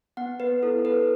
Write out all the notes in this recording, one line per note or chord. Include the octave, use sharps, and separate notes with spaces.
B3 F#5
B3 B4
E4 A4
A4 B4